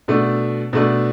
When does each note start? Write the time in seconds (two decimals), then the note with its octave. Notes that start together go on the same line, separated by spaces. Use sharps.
0.08 B2 A3 D4
0.73 B2 A3 D4